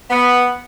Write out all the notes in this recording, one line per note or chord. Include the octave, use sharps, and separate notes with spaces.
B3